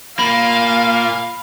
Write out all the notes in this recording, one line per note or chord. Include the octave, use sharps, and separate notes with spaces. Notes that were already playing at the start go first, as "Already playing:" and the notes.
A#2 A#3 F5 B5